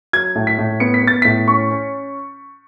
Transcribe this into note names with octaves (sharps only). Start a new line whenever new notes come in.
F#3 G#6
A2
B6
A2
B3 C#7
B6
B3 A6
A2 B6
C#4 C#6
C#4